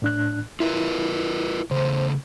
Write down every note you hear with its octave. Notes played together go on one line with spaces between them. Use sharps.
A2 D4 F#6
E4 F4 A#4 B4
C#3 A3 C5